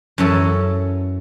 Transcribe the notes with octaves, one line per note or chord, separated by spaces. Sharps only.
F#2 E3 C#4 A4